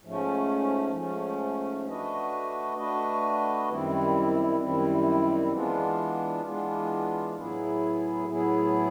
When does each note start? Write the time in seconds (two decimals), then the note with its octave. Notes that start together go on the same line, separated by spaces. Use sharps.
0.04 G#2 F3 A3 C#4
0.95 G#2 F3 A3 C#4
1.86 A3 D4 F#4 B4 D#5
2.78 A3 D4 F#4 B4 D#5
3.70 F#2 D#3 G3 C4 E4
4.60 F#2 D#3 G3 C4 E4
5.52 E3 G#3 B3 D4 F4
6.43 E3 G#3 B3 D4 F4
7.35 A2 F#3 B3 E4 G#4
8.27 A2 F#3 B3 E4 G#4